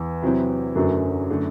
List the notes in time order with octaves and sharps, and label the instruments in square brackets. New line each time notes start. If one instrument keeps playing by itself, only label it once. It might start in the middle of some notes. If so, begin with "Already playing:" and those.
Already playing: [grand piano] E2
[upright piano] C3 F#3 C4 E4
[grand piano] F#2 [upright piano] D3 F#3 A3
[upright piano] D3 A3